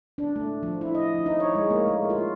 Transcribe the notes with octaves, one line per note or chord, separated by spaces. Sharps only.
D4
A3
F3
E4
D#5
F3
D#4
C#5
G#3
A#3
A3
F4